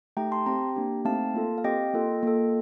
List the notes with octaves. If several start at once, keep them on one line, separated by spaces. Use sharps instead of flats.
A3 D#4 G4 G5 A#5
A5 C6
C4 G4 G5 A#5
A#3 D4 G4
A3 C4 D#4 F5 A5
A#3 F4 A4
F5
C4 G4 D#5 G5
A#3 F4 A4
A#3 F4 A4